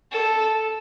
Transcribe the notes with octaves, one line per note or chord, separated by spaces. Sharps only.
A4